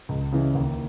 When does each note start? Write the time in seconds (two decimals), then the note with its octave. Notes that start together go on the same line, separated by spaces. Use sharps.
0.09 C#2
0.32 C#3 E3
0.55 D#2